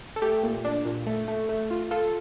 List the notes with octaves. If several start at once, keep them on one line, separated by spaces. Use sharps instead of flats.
A4
A3 G4
A#2
D4
A#2
A3
A3
A3
F4
F4 A4